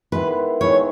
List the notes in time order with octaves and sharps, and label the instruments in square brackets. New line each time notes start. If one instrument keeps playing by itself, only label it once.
[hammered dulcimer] D#3 G#3 B3 E4 [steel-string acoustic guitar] B4
[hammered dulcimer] D#3 G#3 B3 E4 [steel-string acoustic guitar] C#5